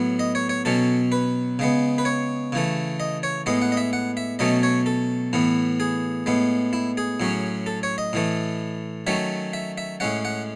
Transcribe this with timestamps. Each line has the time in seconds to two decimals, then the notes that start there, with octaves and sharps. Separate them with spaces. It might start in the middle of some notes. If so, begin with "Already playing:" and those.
Already playing: A2 F#3 B3
0.19 D#5
0.35 C#5
0.49 C#5
0.65 B2 F#3 C#4 A4
1.12 B4
1.59 C#3 G#3 B3
1.98 B4
2.05 C#5
2.52 C#3 E3 A3
3.00 D#5
3.23 C#5
3.46 A2 G#3 B3 D#5
3.62 F#5
3.72 D#5
3.77 E5
3.93 F#5
4.17 E5
4.39 B2 F#3 A3 C#4 D#5
4.63 C#5
4.86 A4
5.33 A2 E3 B3
5.80 G#4
6.26 A2 G#3 B3
6.73 E4
6.97 G#4
7.20 A2 F#3 C#4
7.66 A4
7.83 C#5
7.98 D#5
8.13 A2 E3 A3
9.07 D#3 F#3 A3 C#4 E5
9.53 E5
9.78 E5
10.00 A2 G#3 C#4 F#5
10.25 F#5